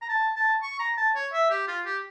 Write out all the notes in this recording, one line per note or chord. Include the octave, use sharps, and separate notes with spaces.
A#5
A5
A5
C#6
A#5
A5
C#5
E5
G4
F4
G4